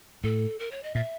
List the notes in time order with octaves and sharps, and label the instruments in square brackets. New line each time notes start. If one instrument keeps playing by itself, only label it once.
[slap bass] A2 [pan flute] A4
[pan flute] A#4
C#5
D#5
[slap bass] A#2 [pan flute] E5